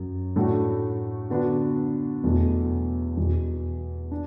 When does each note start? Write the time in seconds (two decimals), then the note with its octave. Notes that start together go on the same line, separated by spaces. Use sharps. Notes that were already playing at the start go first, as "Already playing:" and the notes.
Already playing: F#2 F#3
0.36 A2 A3 D4 F#4
1.30 D3 B3 D4 F#4
2.24 E2 B2 F#3 A3
3.17 E2 B2 B3 F#4
4.11 D4